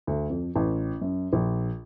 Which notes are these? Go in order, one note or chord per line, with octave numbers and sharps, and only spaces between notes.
D2
F2
A1
F#2
A#1